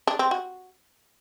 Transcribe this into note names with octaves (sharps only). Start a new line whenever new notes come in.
D4
C4
F#4